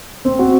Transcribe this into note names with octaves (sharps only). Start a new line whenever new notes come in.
C4
F#4